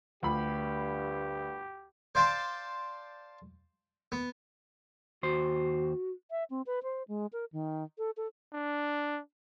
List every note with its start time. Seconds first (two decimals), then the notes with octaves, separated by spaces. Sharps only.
0.23 D2 G2 F4 G4 B5
2.15 C5 D5 F5 G5 A5 C6
4.12 B3
5.23 D#2 F#4 C5
6.31 E5
6.50 C4
6.67 B4
6.83 C5
7.08 G#3
7.33 A#4
7.53 D#3
7.98 A4
8.17 A4
8.53 D4